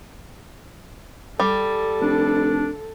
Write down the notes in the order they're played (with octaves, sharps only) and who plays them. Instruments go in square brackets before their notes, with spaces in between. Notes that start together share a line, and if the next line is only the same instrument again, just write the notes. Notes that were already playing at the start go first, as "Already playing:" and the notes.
[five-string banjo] G3 [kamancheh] A4
[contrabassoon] F1 [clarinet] D4